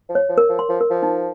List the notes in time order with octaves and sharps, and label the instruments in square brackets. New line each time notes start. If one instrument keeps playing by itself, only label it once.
[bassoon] F3
[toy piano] C#5
[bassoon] F3
[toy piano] A#4
[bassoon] F3
[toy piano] C6
[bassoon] F3
[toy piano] A#4
[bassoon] F3
[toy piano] D#4